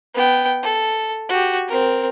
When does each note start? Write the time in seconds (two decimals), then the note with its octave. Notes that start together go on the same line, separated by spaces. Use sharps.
0.15 B3 G5
0.63 A4
1.29 F#4 G4
1.68 C4 A#4